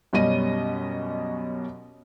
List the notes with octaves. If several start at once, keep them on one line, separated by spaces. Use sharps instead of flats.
F#2 B2 G3 C#4 D#5 D#7